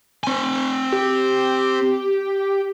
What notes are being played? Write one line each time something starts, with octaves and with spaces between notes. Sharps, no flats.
C4 G#5
G4